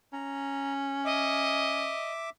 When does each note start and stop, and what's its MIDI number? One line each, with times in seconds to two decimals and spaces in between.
0.13 1.94 61
0.13 0.73 82
1.05 2.12 75
1.05 2.30 76
1.05 2.30 86